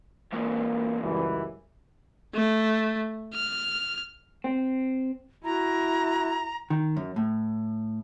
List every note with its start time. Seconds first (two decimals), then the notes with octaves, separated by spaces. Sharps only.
0.33 E2 G#2 A#3
1.03 C#2 F#2 E3 G3
2.34 A3
3.35 F6
4.44 C4
5.44 E4 F#4 A#5
6.70 D#3
6.97 F#2
7.16 A2